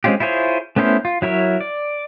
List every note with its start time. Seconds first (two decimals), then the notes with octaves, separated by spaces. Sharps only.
0.04 G#3 C4 C#4 F4 G4
0.20 E4 F4 G#4 C5 C#5
0.76 A3 B3 C#4 E4 C5
1.05 F4
1.22 F#3 E4 A#4 C#5
1.60 D5